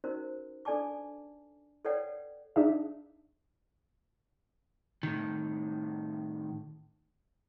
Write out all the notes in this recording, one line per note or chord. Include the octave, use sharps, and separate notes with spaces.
C#4 D#4 F#4 A#4 C5
D4 A4 D5 G#5 A5 D6
A4 B4 C#5 D5 F#5 G5
D4 D#4 G#4 E5
A2 D#3